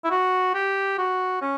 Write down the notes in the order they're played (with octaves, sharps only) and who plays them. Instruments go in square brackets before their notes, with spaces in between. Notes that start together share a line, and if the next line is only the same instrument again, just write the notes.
[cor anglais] E4
F#4
G4
F#4
C#4